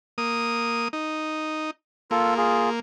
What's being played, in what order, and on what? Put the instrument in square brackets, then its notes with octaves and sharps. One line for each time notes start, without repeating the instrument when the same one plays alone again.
[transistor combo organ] A#3 D#6
D#4
[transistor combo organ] A#3 [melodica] F4 A4
[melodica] F4 G#4